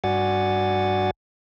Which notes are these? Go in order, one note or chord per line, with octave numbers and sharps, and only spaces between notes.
G2 F#4 D5 F#5 G#5 A6